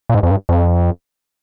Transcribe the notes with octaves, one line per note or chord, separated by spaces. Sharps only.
A#2
G#2
F2
G2
F2